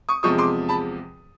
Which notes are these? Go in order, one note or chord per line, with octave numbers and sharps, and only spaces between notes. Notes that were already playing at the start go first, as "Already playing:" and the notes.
C#6 D#6
E2 C3 F3 G#3 C#6 D#6
C6 D6
A5 B5